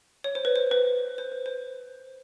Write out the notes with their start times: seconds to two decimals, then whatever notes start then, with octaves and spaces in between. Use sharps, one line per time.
0.24 C#5
0.35 C5
0.45 B4
0.56 C5
0.71 B4
1.18 C5
1.32 B4
1.46 C5